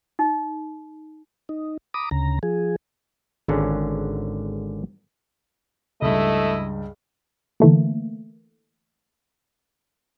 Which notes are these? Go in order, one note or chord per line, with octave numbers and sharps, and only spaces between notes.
D#4
D#4
A#5 B5 D6 D#6
D2 C#3 A#5
F3 G#4
G#1 G#2 D3 C#4
C#2 G2 A3 E4 D#5
D3 E3 A3 A#3